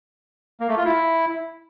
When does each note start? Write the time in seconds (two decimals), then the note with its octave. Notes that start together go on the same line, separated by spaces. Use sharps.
0.60 A#3
0.69 A3
0.77 F4
0.85 E4